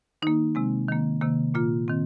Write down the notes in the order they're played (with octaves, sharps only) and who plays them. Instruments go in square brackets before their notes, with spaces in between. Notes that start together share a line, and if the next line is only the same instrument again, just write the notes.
[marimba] D#3 A#3 D#4
C3 G#3 C4
D#3 A#3
C3 D#3 A#3
A#2 A#3 F4
D#3 C4